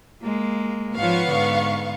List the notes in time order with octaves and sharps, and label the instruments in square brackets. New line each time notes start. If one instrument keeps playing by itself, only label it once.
[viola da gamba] G#3 A#3
[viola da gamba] G#2 F3 C#5 [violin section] B3 F5 C#6
[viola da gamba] G#2 D3